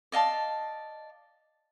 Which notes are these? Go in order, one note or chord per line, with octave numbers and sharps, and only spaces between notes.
D5 D#5 F5 A5